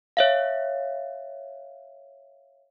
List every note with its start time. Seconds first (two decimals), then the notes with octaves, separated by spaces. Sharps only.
0.17 C#5 E5 F5